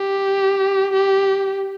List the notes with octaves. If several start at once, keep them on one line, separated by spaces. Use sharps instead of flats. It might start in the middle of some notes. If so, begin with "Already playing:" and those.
Already playing: G4
G4